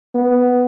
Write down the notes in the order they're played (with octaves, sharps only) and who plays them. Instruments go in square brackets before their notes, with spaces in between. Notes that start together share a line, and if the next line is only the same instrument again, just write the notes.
[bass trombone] B3